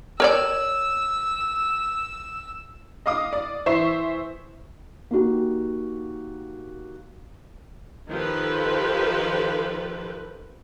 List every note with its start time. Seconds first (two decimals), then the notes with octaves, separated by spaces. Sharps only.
0.20 A#4 C#5 D5 E6
3.06 D#5 F5 D6 D#6
3.33 D5
3.66 E3 C5 E5 C#6 C7 E7
5.11 A#3 D#4 F#4 G4
8.11 D#3 F3 G4 A4 B4